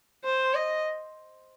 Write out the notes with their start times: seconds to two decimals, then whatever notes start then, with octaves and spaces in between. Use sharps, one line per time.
0.24 C5
0.55 D#5